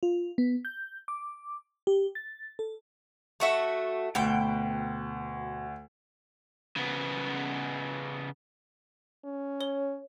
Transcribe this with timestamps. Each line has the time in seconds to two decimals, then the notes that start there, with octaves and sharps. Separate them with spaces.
0.03 F4
0.38 B3
0.65 G6
1.08 D6
1.87 G4
2.15 A6
2.59 A4
3.40 A3 F#4 E5
4.15 D2 B2 G5
6.77 C#3 B3
9.25 C#4
9.61 C#5 G7